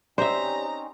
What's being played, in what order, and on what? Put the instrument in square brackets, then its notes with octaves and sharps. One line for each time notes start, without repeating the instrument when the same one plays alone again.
[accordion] C4 C#4 D#4 [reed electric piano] G4 D5 [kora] C5 E5 [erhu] A#5